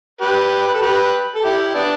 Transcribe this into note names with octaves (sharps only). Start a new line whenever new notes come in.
G4 B4
B4
A4
G4 B4
A4
E4 G4
B3 D4